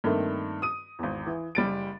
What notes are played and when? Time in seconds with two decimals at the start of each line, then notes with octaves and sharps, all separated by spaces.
0.04 G2 D#3 A3 A#3 C4
0.62 D#6 D#7
0.99 G#1 E2
1.26 E3
1.55 F#1 G3 A6 D7